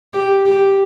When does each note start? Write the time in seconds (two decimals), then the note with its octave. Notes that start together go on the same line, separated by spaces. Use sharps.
0.13 G4
0.45 G4